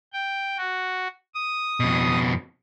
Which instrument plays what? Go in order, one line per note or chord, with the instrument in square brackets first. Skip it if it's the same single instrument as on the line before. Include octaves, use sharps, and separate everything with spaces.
[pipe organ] G5
F#4
D#6
[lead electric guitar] F2 B2